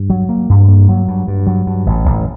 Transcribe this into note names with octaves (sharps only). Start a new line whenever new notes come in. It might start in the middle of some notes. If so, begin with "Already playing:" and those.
Already playing: G2
F#3
A#3
G2
A#3
F#3
G2
G2
F#3
G2
A1
A1